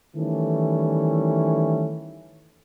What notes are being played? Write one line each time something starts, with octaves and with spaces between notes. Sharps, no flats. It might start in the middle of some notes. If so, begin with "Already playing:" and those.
D#3 E3 G3 A3 C#4